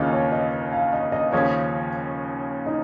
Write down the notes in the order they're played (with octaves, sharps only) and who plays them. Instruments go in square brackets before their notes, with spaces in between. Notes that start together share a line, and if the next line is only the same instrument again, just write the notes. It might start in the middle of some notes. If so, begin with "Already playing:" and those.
Already playing: [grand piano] D#2 C#3 A#3 F4 [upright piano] D#5
[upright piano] C#5
D#5
F5
D#5
D#5
[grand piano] D#2 C#3 F3 C#4 [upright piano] C#5
[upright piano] D#4